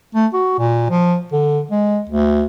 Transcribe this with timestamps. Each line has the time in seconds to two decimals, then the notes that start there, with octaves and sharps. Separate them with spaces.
0.15 A3
0.33 F#4
0.59 A#2
0.90 F3
1.32 D3
1.71 G#3
2.10 D2